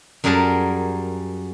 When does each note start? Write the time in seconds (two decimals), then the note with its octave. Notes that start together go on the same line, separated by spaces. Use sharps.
0.24 F#2 G3 G#4 A#4 A5